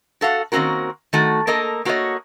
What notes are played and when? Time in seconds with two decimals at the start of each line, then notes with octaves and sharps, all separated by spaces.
0.21 F#4 A4 F5 F#5
0.52 D#3 A#3 C4 C#4 F#4 A#4
1.13 D#3 A3 F#4
1.47 A#3 A4 A#4 D#5
1.85 A#3 F#4 A4 B4 C#5 D#5